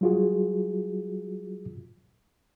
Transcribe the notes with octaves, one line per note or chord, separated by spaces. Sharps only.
F#3 G3 F4 F#4 G#4